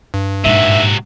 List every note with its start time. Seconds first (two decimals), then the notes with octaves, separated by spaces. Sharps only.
0.14 G2
0.44 A#1 G#2 C3 F#4 E5